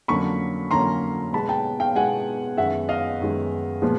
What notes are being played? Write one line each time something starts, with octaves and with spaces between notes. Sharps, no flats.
F2 D3 F#3 A#3 C#4 B5 C#6
F2 D3 F#3 A#3 C#4 A#5 C6
B2 G#3 B3 A5 B5
G5 A5
F5 G5
B2 G#3 B3 F#5 G#5
F#2 D#3 G#3 B3 E5 F#5
D#5 F5
F#2 D#3 G#3 B3
A#2 F3 G#3 B3